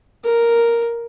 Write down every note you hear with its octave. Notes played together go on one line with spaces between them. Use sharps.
A#4